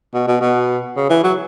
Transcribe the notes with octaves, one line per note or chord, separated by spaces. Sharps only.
B2
B2
B2
C#3
E3
F#3